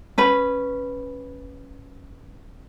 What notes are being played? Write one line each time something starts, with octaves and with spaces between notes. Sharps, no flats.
C#4 B4 B5